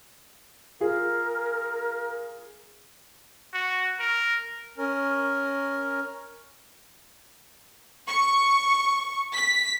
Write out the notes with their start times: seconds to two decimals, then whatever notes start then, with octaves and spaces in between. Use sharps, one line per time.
0.81 F4 G#4 A#4
3.54 F#4
4.00 A#4
4.78 C#4 A#4
8.07 C#6
9.35 B6